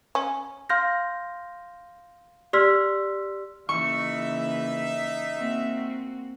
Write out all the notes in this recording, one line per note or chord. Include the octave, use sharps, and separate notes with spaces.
C#4
F5 C6 F6 G6 A#6
G4 D5 C6 E6 F6 B6
C#3 E3 A#3 D#4 E5 C#6
A#3 C4 F#4